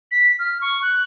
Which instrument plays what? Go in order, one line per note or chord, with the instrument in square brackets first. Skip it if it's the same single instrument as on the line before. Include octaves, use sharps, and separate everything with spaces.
[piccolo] B6
F6
C#6
F#6